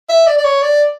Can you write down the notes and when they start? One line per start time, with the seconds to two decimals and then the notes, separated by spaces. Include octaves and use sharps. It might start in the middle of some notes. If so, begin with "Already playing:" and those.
0.09 E5
0.27 D5
0.38 D5
0.44 C#5
0.62 D5